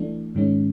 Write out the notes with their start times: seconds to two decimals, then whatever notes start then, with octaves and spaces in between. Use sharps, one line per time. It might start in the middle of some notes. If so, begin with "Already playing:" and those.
Already playing: E3 A3 D4
0.35 G#2 D#3 G#3 C#4